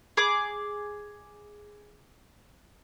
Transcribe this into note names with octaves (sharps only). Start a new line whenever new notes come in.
G#4 D6